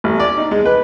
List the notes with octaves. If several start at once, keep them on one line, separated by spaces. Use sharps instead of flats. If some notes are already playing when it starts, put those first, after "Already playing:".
A1
D5
D#4
G#3
B4